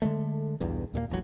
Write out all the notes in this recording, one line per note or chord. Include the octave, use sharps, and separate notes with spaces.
D3 E3 G#3 A3
B1 E2 G2 B2
D#2 A#2 E3 A#3
E1 A1 G2 F#3